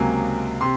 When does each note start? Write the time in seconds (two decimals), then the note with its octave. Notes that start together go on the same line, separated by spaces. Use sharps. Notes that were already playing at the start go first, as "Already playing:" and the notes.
Already playing: C#2 C3 F#3 A#3 G#5
0.61 C3 C6